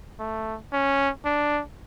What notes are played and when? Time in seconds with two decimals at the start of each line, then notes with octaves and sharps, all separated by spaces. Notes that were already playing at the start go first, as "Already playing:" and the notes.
0.19 A3
0.72 C#4
1.25 D4